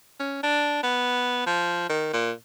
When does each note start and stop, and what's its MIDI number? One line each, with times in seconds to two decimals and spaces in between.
0.20 0.43 61
0.43 0.80 62
0.83 1.42 59
1.47 1.88 53
1.89 2.12 51
2.13 2.32 46